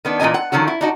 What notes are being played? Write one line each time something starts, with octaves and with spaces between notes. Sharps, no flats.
D#3 B3 D4
A#2 E3 F3 D#5 G#5
F#5
D3 D#3 F3 F#3 F#4
E4
D4 D#4 F#4